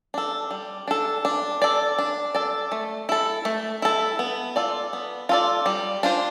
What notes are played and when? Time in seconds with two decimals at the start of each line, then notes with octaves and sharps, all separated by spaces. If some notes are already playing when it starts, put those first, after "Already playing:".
0.14 D4 A4
0.51 G3
0.88 D4 A4
1.25 D4
1.62 A4 D5
1.98 D4
2.35 A4 D5
2.72 A3
3.09 E4 A4
3.45 A3
3.82 E4 A4
4.19 B3
4.56 F4 A4 D5
4.93 B3
5.29 F4 A4 D5
5.66 G3
6.03 D4 F4 C5